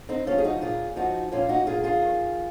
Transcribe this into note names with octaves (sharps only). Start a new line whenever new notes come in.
C4 D#4
F3 C#4 F4
G#4
D#4 F#4
A#2 F4 G#4
F3 D#4 F#4
A#2 C#4 F4
D#4 F#4
A#2 F4 G#4
F4 G#4
D#3